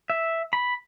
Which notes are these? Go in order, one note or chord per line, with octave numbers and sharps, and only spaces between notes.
E5
B5